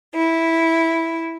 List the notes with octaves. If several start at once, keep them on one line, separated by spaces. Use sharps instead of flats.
E4